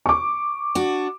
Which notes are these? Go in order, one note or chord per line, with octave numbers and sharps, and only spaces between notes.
C#6 D6
D4 F#4